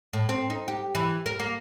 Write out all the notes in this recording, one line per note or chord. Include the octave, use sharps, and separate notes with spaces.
A2
C4
D#4
G4
E3
A#4
A#3